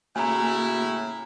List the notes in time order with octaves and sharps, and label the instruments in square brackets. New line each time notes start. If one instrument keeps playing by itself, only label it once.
[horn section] A2 C#3 E4 [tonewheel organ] A#3 F#4 [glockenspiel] G#5 A#5